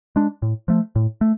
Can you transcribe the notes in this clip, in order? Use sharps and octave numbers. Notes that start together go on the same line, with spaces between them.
G#3 D4
A2
F3 A3
A2
A3